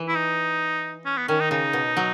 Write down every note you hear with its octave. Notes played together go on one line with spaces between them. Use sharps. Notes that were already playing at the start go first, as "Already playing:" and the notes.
Already playing: E3
E4
D#4
C#4
B3
D#3 C#4
D#4
C#3 D#4
B2
F#3